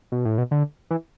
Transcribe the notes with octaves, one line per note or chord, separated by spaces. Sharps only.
B2
A2
B2
D3
E3